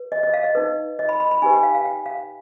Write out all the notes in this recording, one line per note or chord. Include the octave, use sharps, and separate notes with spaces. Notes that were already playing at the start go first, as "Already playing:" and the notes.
Already playing: B4
D#5
D#5
F5
D#5
D#4 B4
D#5
B5
B5
B5
D#4 G4 B4 G#5
G5
F5
F5
G5
F5